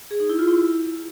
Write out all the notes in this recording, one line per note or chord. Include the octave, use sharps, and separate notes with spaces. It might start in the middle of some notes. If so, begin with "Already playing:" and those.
G#4
D#4
E4
F4
E4